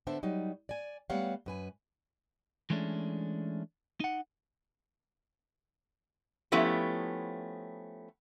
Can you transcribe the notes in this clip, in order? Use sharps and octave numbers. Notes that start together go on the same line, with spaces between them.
D3 B3 D4 C5 E5
F#3 G3 D#4
D5 G#5
G3 A3 B3 C#5 F5 F#5
F#2 B4 G#5
E3 G#3 A3 C#4 D4
D#4 F#5
F3 A3 B3 C#4 E4 G4